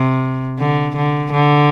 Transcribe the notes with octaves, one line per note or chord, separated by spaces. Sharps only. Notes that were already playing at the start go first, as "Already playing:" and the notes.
Already playing: C3
D3
D3
D3